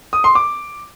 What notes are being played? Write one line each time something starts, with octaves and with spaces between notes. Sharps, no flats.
D#6
C6
D6